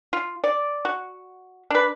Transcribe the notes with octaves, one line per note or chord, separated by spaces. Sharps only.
F4
D5
F#4
D4 B4